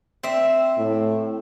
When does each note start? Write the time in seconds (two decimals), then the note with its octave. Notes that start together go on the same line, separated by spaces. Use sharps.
0.23 C4 E5
0.77 A2